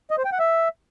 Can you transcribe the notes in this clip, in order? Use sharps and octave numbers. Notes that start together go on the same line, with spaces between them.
D#5
C5
G5
F#5
E5